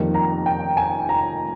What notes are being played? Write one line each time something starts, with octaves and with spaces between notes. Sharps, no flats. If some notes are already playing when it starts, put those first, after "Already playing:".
Already playing: F2 D#3 G3 A#3
A#5
G5
G#5
A#5